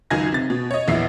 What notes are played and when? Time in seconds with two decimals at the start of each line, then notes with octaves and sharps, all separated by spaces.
0.10 C#2 F#2 D#3 G#5 G#6 A#6
0.32 C3 A6
0.50 B2
0.71 C#5 D#5
0.88 A#1 E2 E3 E5 C7